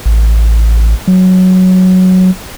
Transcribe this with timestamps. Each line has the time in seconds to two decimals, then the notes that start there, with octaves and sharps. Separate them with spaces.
0.06 A1
1.08 F#3